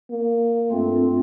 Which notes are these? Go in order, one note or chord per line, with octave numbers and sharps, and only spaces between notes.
A#3
G2 A3 C4 F4